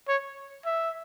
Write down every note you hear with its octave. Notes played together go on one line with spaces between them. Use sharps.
C#5
E5